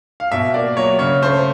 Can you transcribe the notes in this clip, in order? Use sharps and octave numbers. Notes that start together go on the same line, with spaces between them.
F5
B2 E5
A#3 D5
F#3 C#5
C#3 C#5
A3 C5